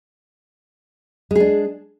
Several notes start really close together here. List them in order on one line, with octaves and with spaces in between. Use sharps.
G#3 G#4 D4